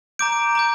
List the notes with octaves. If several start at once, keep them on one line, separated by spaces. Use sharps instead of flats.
A#5 D6 G6 D7
A#5 D6 G6